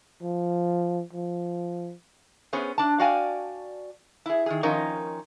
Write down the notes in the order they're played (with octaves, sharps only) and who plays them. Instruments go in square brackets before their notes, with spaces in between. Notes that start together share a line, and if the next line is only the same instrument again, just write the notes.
[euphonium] F3
F3
[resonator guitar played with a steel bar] B3 C#4 G#4 C5
D4 A5
F#4 D5 F5 G5 G#5
E4 G#4
D#3 G#4
D#3 F3 C#4 D#4 A#4